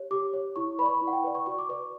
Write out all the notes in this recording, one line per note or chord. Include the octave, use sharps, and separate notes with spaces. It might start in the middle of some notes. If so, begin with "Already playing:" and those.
Already playing: G4 C#5
G4 D6
C#5
E4 C#6
B4 D5 B5 C#6
B5
E4
F#5
G5
B4 D5
C#6
F#4 C#6
D6
B4 D5 D6